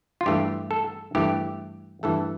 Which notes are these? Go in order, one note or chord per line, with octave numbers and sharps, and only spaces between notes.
F4
G2 E3 A3 G4
A4
G2 E3 A3 G4
G2 E3 A3 A4